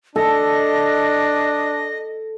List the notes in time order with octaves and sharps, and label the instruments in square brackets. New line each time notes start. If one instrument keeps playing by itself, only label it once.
[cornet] D4 [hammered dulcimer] A4 [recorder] D#5